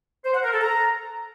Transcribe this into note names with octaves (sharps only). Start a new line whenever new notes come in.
C5
F#5
A#4
A4
A#5